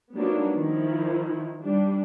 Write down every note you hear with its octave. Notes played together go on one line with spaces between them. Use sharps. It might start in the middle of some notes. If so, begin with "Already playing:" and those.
F#3 G3 A#3 B3 D4 D#4
D#3 F3 E4
G3 D4